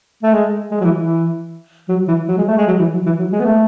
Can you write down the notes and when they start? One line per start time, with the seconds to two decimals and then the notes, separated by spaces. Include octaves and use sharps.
0.23 A3
0.32 G#3
0.71 G#3
0.80 F#3
0.85 E3
0.98 E3
1.89 F#3
2.08 E3
2.28 F#3
2.37 G#3
2.48 A3
2.57 G#3
2.67 F#3
2.79 E3
2.93 F#3
3.06 E3
3.19 F#3
3.32 G#3
3.40 B3
3.45 A3